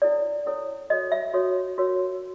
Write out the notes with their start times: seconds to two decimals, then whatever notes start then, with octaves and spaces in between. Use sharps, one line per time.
0.02 C#4 E4 A4 C#5 D5
0.46 C#4 E4 A4 C#5
0.90 F#4 A4 C#5 D#5
1.12 E5
1.34 F#4 A4 C#5
1.78 F#4 A#4 C#5